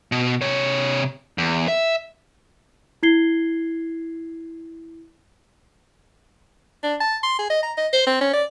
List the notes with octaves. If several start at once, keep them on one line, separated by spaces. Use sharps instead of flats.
B2
C3 C#5
E2
E5
E4 G#6 C7 G7
D4
A5
C6
G#4
D#5
A#5
D#5
C5
C4
C#4
D5